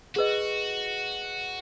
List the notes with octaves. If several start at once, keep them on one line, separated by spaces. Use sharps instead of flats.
F#4 G#4 B4 D#5